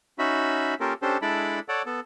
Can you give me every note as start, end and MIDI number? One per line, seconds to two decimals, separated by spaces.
0.19 0.74 61
0.19 0.74 63
0.19 0.74 66
0.19 0.74 76
0.19 0.74 83
0.80 0.93 58
0.80 0.93 61
0.80 0.93 65
0.80 0.93 67
0.80 0.93 69
0.80 0.93 70
1.02 1.17 61
1.02 1.17 62
1.02 1.17 67
1.02 1.17 69
1.02 1.17 72
1.22 1.59 56
1.22 1.59 62
1.22 1.59 64
1.22 1.59 69
1.22 1.59 74
1.22 1.59 83
1.69 1.82 69
1.69 1.82 73
1.69 1.82 74
1.69 1.82 78
1.86 2.00 59
1.86 2.00 69